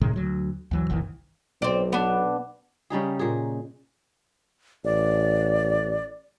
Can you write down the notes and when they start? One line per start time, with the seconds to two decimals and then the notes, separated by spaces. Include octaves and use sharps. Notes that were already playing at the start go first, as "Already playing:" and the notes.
0.01 A2 C3 D#3 G#3
0.16 D2 F#3
0.71 D2 E3 F#3
0.90 F#1 C2 D#3 E3
1.62 B1 C4 D5
1.92 B3 D4
2.90 C#3 G3 D#4 G#4
3.19 A#2 G#4
4.85 A1 D5